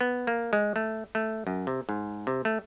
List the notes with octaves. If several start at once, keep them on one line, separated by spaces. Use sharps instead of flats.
B3
A#3
G#3
A3
A3
F#2
C3
G#2
C3
A3